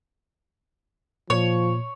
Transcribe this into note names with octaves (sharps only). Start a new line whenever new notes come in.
A#2 F3 C#5